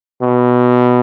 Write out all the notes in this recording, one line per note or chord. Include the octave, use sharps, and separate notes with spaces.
B2